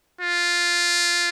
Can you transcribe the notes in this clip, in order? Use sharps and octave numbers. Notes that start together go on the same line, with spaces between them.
F4